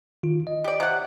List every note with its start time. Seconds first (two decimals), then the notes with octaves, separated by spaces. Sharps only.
0.23 D#3 F4
0.47 D#5
0.64 G4 D5
0.80 C3 F#5